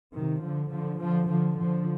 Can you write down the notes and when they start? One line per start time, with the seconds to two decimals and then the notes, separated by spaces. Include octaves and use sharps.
0.14 C3 D#3
0.42 D3 F3
0.70 D3 F3
1.00 D3 F3
1.28 D3 F3
1.57 D3 F3